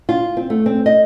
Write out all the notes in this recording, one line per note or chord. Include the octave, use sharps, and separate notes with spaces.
F4
C4
A3
C4
D#5